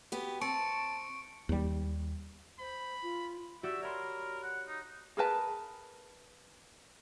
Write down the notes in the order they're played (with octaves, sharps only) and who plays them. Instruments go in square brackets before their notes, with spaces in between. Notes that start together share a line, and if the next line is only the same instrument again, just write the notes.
[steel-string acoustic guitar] B3 F#4 G4
[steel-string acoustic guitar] C4 [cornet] A5 [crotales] C#6 C#7 D7
[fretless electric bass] D#2 G3
[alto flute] C5 [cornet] B5
[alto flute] F4
[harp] F#4 G4 D5 [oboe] E5
[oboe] A#4 [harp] C#5 B5 C6
[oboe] F#5
D#4
[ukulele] G#4 A#4 B4 A5